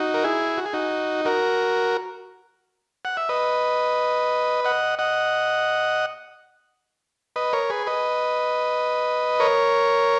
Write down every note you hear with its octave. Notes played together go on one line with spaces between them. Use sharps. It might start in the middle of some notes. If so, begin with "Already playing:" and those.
Already playing: D#4 F#4
A#4
E4 G#4
F#4
G#4
D#4 F#4
F#4 A#4
F#5
E5
B4 D#5
D#5 F#5
D#5 F#5
B4 D#5
A#4 C#5
G#4 B4
B4 D#5
A#4 C#5